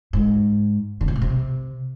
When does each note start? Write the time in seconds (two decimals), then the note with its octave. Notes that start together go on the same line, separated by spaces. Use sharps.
0.13 G#2
1.01 D3
1.08 C3
1.16 A#2
1.22 C3